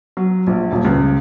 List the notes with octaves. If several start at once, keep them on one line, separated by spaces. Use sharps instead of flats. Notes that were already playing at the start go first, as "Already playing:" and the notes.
F#3
A#1
D#1
C#2